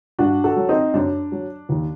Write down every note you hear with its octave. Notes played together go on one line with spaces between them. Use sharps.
G2 D4 F#4
F#4 A4
F#3
C4 D#4
F#2 D4
F#3
D#2